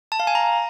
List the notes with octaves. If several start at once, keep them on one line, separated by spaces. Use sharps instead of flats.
A5
F5
G#5
A#5